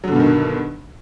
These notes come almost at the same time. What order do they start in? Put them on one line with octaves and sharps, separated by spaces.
F#3 D3 B2 G2 D#3